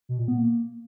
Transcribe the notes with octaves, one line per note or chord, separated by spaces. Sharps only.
B2
A#2
B3
A#3